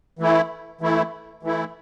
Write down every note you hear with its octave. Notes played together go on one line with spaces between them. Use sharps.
E3 A3 E4
E3 A3 E4
E3 A3 E4